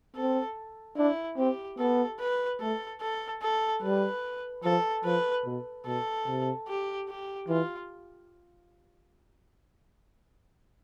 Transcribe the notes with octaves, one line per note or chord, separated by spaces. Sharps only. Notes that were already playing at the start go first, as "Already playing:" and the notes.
C4 A4
D4 E4
C4 G4
B3 A4
B4
A3 A4
A4
A4
G3 B4
F3 A4
F3 B4
B2
B2 A4
C3
G4
G4
E3 F4